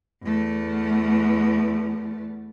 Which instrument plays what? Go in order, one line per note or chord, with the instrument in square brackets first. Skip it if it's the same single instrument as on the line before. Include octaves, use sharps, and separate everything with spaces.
[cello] E2 A3